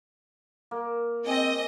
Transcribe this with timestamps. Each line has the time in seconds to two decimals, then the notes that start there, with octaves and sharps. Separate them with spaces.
0.71 A#3
1.26 C4 G#4 D#5